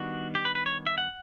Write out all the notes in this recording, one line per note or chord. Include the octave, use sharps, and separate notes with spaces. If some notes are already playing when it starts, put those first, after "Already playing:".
Already playing: D#3 G3 B3 D4 F#4
G4
B4
B4
C#5
E5
F#5